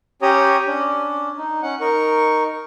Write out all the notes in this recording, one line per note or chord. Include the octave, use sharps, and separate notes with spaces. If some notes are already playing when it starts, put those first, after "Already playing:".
C#4 G4 C#5 G5 A#5 D#6
C#4 D4
D#4
C#4 F#5
D#4 A#4 C#6